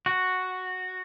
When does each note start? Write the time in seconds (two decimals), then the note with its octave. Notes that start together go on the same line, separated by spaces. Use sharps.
0.06 F#4